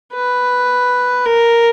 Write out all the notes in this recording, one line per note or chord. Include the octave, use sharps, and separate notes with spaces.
B4
A#4